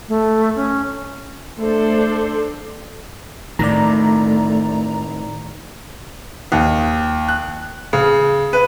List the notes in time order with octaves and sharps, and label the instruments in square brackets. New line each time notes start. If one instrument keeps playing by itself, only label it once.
[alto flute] A3
C#4
[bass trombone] A3 [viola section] D4 A4 C5
[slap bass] A2 D#3 [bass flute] A3 [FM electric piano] D5 A#5
[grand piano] D#2
F#6
C#3
B4